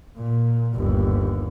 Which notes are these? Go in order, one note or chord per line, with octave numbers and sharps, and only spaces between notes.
A#2
G1 D#2